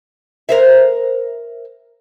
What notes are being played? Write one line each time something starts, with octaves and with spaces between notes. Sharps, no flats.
A#4 C5 E5